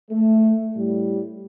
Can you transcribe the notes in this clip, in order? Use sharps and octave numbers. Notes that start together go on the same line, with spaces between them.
A3
A2 G3